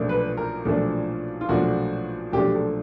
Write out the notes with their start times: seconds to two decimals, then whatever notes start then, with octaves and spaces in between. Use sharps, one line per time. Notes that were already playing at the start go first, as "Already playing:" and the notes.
Already playing: B1 A#2 F3 A3 D4
0.09 B4
0.37 A#4
0.65 B1 A#2 F3 A3 D4 A4
1.41 F4
1.49 B1 A#2 F3 A3 D4 F#4
2.33 B1 A#2 F3 A3 D4 G4
2.55 A4